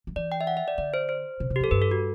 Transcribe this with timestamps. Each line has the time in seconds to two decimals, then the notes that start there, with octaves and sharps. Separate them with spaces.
0.07 F#3
0.16 E3 D5
0.32 G5
0.41 E5
0.47 F#5
0.57 E5
0.68 D5
0.78 D3 D5
0.94 C5
1.09 C5
1.40 C3
1.50 C3
1.56 G4
1.61 F#3
1.64 A4
1.71 G2 B4
1.82 A4
1.91 F#4